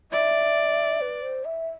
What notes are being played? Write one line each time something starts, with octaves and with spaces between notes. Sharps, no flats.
D5 E5
B4
C5
E5